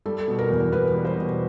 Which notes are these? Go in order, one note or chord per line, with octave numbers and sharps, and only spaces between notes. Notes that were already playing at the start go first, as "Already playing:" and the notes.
G3 A4
B2
A#4
E2
E2 B4
G3
C5
B2